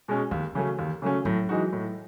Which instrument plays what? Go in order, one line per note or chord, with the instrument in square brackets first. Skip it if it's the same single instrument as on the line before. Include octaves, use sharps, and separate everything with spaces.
[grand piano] B2 G#3 C#4
[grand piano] D#2 [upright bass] E3
[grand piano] C#3 F#3 A3 C#4
D#2
C#3 F#3 A3 C#4
[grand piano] A2 [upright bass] F#3
[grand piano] E3 G#3 D#4 F#4
A2